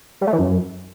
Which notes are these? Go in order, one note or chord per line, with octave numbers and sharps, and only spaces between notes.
G3
A3
E3
F#2